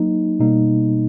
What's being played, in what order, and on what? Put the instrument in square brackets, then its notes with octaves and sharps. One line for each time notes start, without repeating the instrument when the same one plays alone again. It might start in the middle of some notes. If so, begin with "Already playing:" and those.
Already playing: [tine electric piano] F#3 A#3 D#4
B2 G3 A#3 D#4